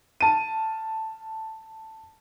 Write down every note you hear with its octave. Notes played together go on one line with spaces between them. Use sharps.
A5 D#7